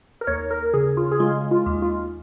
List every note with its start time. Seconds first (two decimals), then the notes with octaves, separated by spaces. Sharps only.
0.21 A#4
0.27 D#2 C#5
0.51 A#4
0.74 C#3 G#4
0.97 F4
1.12 G#4
1.20 G#3 F4
1.51 F4
1.66 D#2
1.82 F4